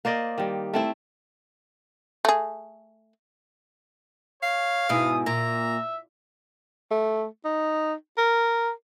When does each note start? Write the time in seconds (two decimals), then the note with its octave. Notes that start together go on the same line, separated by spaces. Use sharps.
0.05 A#3 C5 D5 D#5
0.38 D#3 G3
0.74 A3 C4 E4
2.25 A3 G#4
4.43 C#5 F5
4.89 G#2 B2 E4 D#6
5.26 A#2 E5 A#5
6.91 A3
7.45 D#4
8.18 A#4